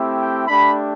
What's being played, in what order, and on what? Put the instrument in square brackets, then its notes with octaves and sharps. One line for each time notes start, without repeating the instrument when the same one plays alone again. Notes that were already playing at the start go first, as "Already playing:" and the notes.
Already playing: [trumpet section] A3 C4 E4 G4
G5
A3 D4 G4 B5